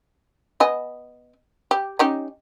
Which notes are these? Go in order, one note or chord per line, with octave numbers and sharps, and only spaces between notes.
B3 D#5 G#5
G4
C#4 D#4 G4